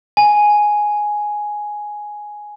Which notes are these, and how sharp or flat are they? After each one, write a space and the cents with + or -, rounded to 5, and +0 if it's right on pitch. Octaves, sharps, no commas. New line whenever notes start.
G#5 +5